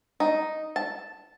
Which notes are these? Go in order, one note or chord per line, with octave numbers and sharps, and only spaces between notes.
D#4
A5